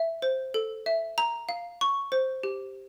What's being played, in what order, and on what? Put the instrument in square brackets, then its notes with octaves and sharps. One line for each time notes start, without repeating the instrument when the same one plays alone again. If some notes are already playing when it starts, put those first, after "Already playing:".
Already playing: [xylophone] E5
C5
A4
E5
A#5
F5
C#6
C5
G4